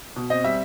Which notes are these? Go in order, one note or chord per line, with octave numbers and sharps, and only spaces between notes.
B2
C4 D#5
G3 E5